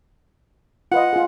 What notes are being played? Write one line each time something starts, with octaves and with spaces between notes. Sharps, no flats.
F4 B4 D#5 F#5
F4 G#4